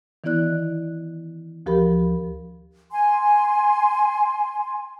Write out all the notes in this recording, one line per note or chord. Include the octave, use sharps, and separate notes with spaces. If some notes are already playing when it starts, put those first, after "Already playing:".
D#3 E3 B3 E4 D5 F#6
D2 F3 G4 A#4 B5
G#5 C6